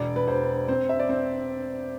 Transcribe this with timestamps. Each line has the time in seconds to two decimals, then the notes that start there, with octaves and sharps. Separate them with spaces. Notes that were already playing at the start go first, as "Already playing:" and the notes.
Already playing: E1 D5
0.16 B4
0.28 E1 C5
0.68 C4 C5
0.89 E5
0.99 D5
1.09 C4 C5